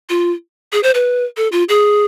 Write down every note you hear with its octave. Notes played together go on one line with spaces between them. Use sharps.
F4
G#4
C5
B4
A4
F4
G#4